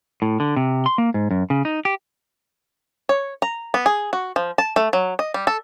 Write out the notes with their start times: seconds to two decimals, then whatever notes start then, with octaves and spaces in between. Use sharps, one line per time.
0.22 A2
0.40 D3
0.56 C3
0.86 C6
0.98 A#3
1.14 G#2
1.31 F#2
1.50 C#3
1.65 D#4
1.85 G4
3.09 C#5
3.42 A#5
3.74 B3
3.86 G#4
4.13 F#4
4.36 F3
4.58 A5
4.76 A3
4.93 F#3
5.19 D#5
5.34 G3
5.47 A4